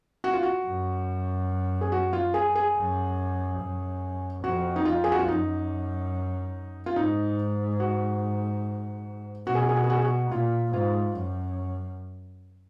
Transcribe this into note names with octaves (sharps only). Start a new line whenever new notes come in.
F#4
F4
F#4
F#2
G#4
F#4
F4
G#4
G#4
F#2
F#2
F2 F#4
D#4
F4
G#4
F#4
F4
F#2 D#4
F4
G#2 D#4
F#4
B2 F#4
G#4
F#4
G#4
F#4
G#4
F#4
G#4
F#4
A#2 F4
G#2 F4
F#2